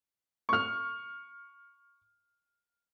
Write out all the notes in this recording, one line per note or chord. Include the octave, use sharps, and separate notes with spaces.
C#6 F6